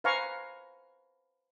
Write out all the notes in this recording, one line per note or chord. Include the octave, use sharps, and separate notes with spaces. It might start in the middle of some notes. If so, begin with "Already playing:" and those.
B4 C5 F5 G#5 A#5 C#6